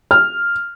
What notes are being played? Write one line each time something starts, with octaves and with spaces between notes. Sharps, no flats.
F6